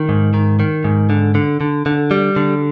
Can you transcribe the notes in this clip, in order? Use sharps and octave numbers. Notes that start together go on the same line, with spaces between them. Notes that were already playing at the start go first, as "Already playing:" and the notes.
Already playing: D#3
G#2
D#3
D#3
G#2
D3
D3
D3
D3
G3
D3